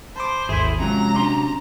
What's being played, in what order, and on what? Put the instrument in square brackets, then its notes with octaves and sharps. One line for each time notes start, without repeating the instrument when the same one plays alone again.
[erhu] C5 [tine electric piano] A5 B5 D6
[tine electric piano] G#1 D#2 A4 [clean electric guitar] E4 G#4 [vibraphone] E5
[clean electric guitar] F2 C3 F#3 [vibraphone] G#3 [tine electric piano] C#4 [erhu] A#5
[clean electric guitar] C3 F#3 C6 [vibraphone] D4